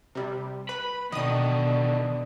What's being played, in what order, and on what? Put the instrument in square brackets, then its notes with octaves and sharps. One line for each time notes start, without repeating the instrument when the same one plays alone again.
[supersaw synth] C3 G3
[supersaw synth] B4 [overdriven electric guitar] B5
[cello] B2 [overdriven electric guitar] D3 D#3 [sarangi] D4 [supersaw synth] D#5 D#6